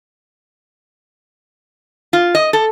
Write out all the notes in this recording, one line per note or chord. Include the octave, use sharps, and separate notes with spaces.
F4
D#5
A4